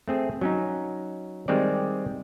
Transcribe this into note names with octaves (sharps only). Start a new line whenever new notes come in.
A3 C4 G#4
F#3 C#4 D#4
D#3 G3 G#3 C4 D5